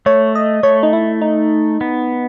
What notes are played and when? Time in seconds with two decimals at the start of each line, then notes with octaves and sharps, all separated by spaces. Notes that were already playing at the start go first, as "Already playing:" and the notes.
0.06 A3 C#5
0.35 D#5
0.63 A3 C#5
0.83 D#4
0.93 E4
1.22 D#4
1.81 B3